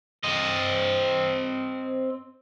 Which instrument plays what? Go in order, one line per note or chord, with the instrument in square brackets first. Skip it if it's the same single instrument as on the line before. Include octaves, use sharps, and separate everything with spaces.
[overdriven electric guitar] C4 D#5